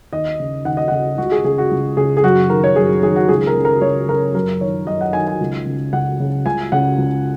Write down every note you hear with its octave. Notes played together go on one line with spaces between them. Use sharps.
D#2 D#5
C#3
D#2 F#5
D#5
C#3 F#5
C#2 F#4
G#4
C#3 G#4
F#4
C#2
C#3 G#4
G#4
F#2 F#4
D#3 A#4
C#5
F#2 G#4
D#3 G#4
F#4
C#2 G#4
A#4
C#3
A#4
C#2 C#5
C#3 A#4
F#2 A#4
D#3 C#5
F#2 D#5
F#5
D#3 G#5
G#5
C#2
C#3
C#2 F#5
C#3
C#2 G#5
C#3 F#5
C#2